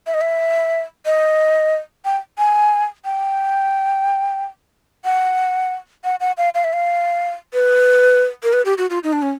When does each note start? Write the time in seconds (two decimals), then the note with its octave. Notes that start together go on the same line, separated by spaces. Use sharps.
0.07 E5
0.14 D#5
0.21 E5
1.06 D#5
2.05 G5
2.38 G#5
3.05 G5
5.05 F#5
6.04 F#5
6.20 F#5
6.38 F5
6.55 F5
6.64 E5
6.73 F5
7.54 B4
8.43 A#4
8.53 B4
8.65 G4
8.78 F#4
8.90 F4
9.03 D#4
9.13 D4
9.22 C#4